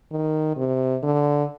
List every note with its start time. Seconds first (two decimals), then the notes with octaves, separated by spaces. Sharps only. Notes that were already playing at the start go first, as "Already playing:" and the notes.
0.12 D#3
0.57 C3
1.03 D3